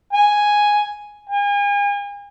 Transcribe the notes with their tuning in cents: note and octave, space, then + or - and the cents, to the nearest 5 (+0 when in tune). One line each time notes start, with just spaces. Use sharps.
G#5 +0
G#5 -40